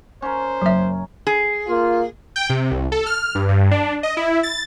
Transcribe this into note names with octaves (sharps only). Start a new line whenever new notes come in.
C#4 A#4 C5
F#1 F#3 E5
G#4
A#3 F4
G5
C3
C2
A4
F6
G2
G2
D4
D#5
E4
A6